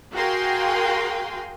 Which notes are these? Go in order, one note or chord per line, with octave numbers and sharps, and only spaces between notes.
F#4 G#4 A#4 F5 G5 C6